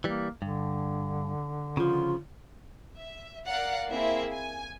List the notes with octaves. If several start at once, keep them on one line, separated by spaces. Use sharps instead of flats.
E3 G3 A#3
G2 D3
C#3 F3 F4
E5
A#4 D5 F5 F#5
A#3 C4 E4 G#4 E5
G#5